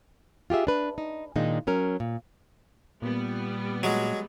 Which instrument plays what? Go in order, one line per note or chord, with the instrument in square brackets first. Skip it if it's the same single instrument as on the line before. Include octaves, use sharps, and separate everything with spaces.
[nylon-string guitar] F4 G4 G#4 E5
D4 B4
D#4
A#2 D#3 G#3 D4 D#4
F#3 C#4 A#4
A#2
[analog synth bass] A#2 [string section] G3 B3
[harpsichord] F#3 G#3